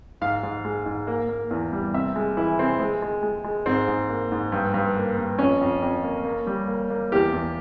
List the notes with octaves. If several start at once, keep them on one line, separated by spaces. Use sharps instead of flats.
G#2 F5
G#2
G#3
G#2
A#3
A#3
E2
G3
C3 E5
G#3
E3 E4
C3 C4
G#3
G#3
G#3
G#3
G#2 C4
G#2
A#3
G#2
G2
G2
A#3
G2
F2 C#4
F2
F2
A#3
A#3
G3
A#3
A#3
E2 G4
E2